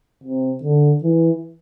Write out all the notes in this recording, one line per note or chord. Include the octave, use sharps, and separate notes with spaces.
C3
D3
E3